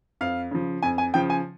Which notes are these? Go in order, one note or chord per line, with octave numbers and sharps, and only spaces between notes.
F2 F5
C#3 F3
F2 G#5
G#5
C#3 F3 G5
G#5